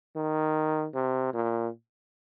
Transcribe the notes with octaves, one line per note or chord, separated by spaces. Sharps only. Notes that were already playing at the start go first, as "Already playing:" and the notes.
D#3
C3
A#2